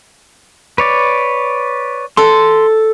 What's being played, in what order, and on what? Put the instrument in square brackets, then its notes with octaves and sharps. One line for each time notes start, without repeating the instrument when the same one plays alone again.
[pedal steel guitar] B4 C#5 D5
[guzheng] A4 [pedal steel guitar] C6